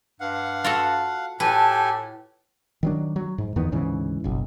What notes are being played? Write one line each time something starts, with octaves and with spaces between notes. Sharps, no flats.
G2 F5 F#5
F4 F#4 A4
A2 G4 A4 B4 G#5 A5
D#3 F#3 D4
F#3
G#2
E2 D#3 B3
D2 G#2 C#3 E3
F#1 B1